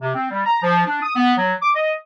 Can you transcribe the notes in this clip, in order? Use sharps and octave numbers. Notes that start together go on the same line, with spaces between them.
C3
C4
G3
A#5
F3
D4
D#6
B3
F#3
D6
D#5